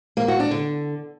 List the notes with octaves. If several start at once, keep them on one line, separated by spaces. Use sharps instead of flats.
A#3
F#4
D4
D3